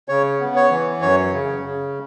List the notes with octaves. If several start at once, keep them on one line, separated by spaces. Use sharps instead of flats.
C#3 C#5
B3
C#5
E3
F#2 C#5
C#3
C#3